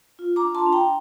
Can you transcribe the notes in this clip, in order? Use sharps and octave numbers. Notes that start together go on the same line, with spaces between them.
F4
A#5 D6
D4
A5 C6
D4
G5 A#5